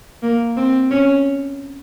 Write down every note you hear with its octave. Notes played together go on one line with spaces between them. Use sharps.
A#3
C4
C#4